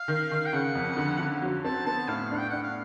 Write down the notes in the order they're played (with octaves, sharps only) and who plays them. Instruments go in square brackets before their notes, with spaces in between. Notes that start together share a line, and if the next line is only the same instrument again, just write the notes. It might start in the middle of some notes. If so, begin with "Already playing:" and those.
Already playing: [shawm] F5
[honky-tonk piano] D#3
D#3
[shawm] G5
[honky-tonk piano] C#3 [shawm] F#5
[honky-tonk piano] F2
D3
D3
F#3
[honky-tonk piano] C4 [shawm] A5
[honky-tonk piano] B3 [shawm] A5
[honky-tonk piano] A2 [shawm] F5
[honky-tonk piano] D4
[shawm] G5
[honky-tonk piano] D4 [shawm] F#5
[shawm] F5